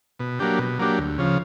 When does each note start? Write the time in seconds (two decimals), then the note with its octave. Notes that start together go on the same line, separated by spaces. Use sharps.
0.19 B2
0.40 F#3 A#3 D4 G4
0.59 B2
0.79 F#3 A#3 D4 G4
0.98 D2
1.18 C#3 F3